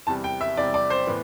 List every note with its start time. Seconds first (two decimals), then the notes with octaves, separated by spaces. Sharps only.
0.07 E2 C3 G3 A5
0.24 G5
0.41 E5
0.57 E2 C3 G3 D5
0.74 D5
0.90 C5
1.07 A2 E3 B3